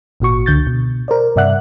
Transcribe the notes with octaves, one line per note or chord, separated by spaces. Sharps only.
G#1 A#2 F#4 C#6
C#2 D3 G6 A6
B2
A#4 C5 D5
G2 C3 D5 E5 F#5 F#6